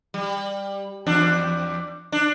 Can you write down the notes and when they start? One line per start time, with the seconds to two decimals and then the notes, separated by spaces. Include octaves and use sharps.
0.14 G3
1.07 E2 D4
2.12 D4